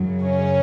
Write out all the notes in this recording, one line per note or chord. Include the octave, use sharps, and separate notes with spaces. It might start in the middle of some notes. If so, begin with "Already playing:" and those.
Already playing: F#2 C#3 F#3
C#4